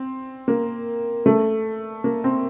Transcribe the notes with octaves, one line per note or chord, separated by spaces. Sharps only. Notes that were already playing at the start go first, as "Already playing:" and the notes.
Already playing: C4
A#3
A3
A#3
C4